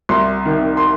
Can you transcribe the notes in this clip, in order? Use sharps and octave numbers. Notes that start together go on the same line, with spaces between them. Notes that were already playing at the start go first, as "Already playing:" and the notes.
C2 C6
C3 D#3
C6